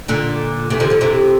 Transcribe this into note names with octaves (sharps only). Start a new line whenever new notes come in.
A#2 D3
C3 E3
D3 F3
D3 F3
C3 E3